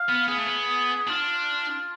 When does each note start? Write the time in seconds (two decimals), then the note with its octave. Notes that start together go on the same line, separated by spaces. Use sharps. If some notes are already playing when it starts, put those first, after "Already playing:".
Already playing: F5
0.09 B3
0.28 B3 G#4
0.37 A3
0.46 B3
1.08 D4 F4